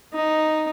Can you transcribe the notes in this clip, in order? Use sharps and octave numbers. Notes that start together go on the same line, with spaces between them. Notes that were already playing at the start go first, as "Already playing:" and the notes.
D#4